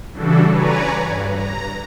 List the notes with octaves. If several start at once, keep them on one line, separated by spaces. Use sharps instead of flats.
C#3 E3 G3 D4 F#4 A4
B4 C#5 D5 G#5 A#5
G2
A#5